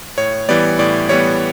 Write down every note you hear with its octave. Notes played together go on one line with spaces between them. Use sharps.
A2 C#5
E3 G3 B3 D5
A2 D5
E3 G3 B3 C#5